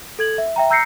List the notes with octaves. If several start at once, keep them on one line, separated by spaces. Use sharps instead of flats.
A4 G#6 F#7
E5
E5 G5 A#5
A#5 E6 G6 A#6 C7 C#7